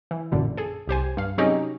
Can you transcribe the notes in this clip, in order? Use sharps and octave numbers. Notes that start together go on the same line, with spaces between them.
E3
A1 F#2 A#2 D3
G#4 A4
C2 G4 C5 G#5
G2 F5
C3 F#3 C#4 D#4 G4 G#4